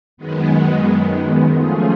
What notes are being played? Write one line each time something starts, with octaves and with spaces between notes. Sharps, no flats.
F#2 D#3 G#3 B3
F3 A3 C#4 F4 G#4